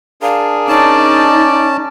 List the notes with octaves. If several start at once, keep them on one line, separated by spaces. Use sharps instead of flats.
D4 G#4 A#4 F5
C#4 D#4 D5 A5